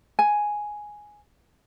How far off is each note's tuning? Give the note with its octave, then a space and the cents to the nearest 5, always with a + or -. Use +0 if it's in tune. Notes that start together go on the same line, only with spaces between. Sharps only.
G#5 +5